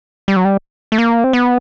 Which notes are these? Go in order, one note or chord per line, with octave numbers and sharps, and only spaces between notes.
G3
F#3
G3
A3
A#3
C4
B3